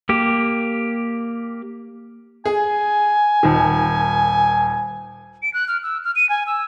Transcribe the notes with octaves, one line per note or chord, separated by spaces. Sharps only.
A#3 G4
G#4 G#5
D#1 D#3
D7
F#6
F6
E6
F6
D#7
G#5
E6